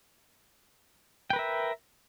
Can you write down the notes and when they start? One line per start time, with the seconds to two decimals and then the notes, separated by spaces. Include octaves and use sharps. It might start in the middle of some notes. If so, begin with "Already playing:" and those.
1.30 G5
1.33 B4
1.36 A#4
1.39 E5